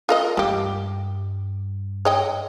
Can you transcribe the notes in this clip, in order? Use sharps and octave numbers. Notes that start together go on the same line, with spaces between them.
F4 A#4 D#5
G2 G3 G4
C#5 D#5 G5